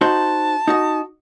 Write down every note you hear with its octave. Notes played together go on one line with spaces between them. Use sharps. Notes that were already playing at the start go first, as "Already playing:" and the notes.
D#4 F#4 C5 A5
D#4 F#4 D#5